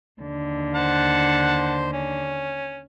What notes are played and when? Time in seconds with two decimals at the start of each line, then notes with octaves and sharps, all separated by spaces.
0.22 D#2 D3
0.75 C5 F#5 A5
1.93 C#4